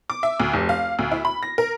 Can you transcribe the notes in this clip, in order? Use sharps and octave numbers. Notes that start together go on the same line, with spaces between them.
D6
E5
D2
F1
F5
D2
E4
B5
A#6
A#4